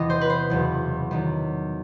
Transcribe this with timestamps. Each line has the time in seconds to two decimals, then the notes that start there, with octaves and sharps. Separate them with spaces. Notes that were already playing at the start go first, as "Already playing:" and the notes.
Already playing: E2 C3 E3 D#5
0.10 C5
0.21 B4
0.30 C5
0.50 F#1 E2 B2
1.11 E2 D#3 F#3